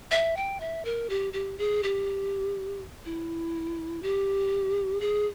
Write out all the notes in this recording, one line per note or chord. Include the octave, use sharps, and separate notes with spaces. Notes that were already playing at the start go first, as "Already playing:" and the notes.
E5
G5
E5
A#4
G4
G4
G#4
G4
E4
G4
G#4